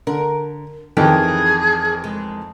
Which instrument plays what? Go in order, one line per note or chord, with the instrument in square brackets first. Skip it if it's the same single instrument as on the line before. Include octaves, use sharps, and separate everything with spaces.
[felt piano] D3 [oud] A#4
[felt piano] F2 D#3 E3 [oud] G4 [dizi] G#4
[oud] G#3